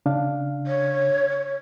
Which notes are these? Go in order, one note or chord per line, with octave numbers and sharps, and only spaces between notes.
C#3 D4 F5
C#5